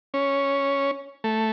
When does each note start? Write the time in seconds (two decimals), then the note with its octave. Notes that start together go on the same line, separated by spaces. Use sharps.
0.14 C#4
1.24 A3